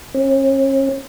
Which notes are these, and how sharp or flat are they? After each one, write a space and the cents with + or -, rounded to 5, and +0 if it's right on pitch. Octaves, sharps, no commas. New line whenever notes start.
C#4 -40